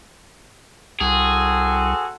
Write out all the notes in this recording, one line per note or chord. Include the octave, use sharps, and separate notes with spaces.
C2 C4 F#4 G#4 A4